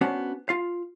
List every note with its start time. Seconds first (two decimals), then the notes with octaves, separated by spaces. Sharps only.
0.01 B3 C#4 D4 F#4 C5
0.49 F4 F5